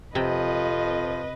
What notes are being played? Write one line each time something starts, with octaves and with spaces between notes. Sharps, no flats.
F2 C3 F3 B4 D#5 G5